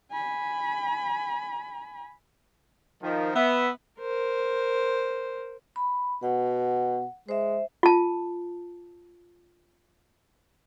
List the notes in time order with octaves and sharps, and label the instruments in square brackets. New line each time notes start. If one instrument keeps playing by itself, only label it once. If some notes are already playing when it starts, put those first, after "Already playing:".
[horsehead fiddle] G#5 B5
[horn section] D#3 F3
B3 E5
[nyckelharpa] A#4 C5
[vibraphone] B5
[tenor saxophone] B2 [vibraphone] F#5
[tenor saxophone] G#3 [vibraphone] C5 E5
[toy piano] F4 A5